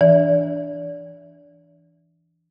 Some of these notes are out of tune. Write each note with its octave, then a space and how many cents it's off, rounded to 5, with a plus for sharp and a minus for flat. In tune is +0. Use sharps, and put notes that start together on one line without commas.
E3 +0 D4 -5 D5 -30